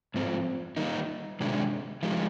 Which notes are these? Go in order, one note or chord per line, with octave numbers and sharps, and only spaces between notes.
G#2 F3 C4
D#3 G3 A#3 D#4
C3 D#3 G#3 D4
F3 G#3 D#4 G4